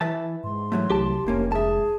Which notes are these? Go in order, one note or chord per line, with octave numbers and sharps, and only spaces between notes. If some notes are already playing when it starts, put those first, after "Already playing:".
E3 B4 E5 A5
G#2 C6
E3 F#3 A3
C2 G4 A5
F1 C2 A#3 C#4 A#4
G#2 G#4 E5 A5